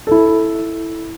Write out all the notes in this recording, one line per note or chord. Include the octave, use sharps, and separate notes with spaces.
E4 A4